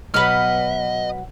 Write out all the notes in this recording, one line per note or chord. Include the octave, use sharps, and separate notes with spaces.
B2 F#3 B4 D#5 F#5 F6